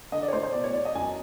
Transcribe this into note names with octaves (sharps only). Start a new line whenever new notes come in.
D3 D#5
D5
C#5
A1 C5
C5
B2 D5
C#5
E2 D5
D#5
F#2 G#5